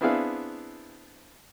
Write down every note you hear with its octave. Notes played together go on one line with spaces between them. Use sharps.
B3 C4 D4 E4 G#4 F5